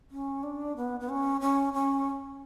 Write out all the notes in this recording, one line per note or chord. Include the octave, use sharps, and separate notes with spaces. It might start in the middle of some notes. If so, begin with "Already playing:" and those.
C#4
D4
B3
B3
C#4
C#4
C#4